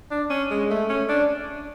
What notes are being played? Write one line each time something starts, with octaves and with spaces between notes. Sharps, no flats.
D4
C#4
G#3
A3
C#4
D4